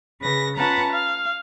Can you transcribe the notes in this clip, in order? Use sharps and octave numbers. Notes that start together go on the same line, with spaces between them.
C#3 B4 A#6
C#4 F4 B4 F#5 A5 A#5
F5